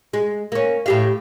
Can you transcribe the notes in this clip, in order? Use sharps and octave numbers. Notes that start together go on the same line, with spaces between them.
G#3
A#3 C#4
A2 G4 F5